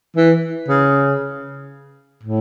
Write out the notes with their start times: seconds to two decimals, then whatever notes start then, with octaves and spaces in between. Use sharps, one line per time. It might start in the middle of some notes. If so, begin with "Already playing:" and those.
0.16 E3
0.68 C#3
2.23 A2